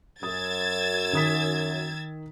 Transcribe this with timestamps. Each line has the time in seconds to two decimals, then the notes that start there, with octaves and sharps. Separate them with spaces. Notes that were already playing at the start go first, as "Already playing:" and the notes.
0.23 F#2 D#6 E6 G#6 A6
1.13 D#3 D#6 B6